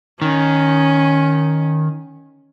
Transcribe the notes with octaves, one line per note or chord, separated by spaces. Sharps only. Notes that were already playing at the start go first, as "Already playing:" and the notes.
D#3 C#4